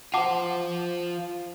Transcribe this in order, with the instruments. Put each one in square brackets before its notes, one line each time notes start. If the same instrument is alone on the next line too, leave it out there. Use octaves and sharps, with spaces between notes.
[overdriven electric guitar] F4 C5 [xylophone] F#5 A5 D6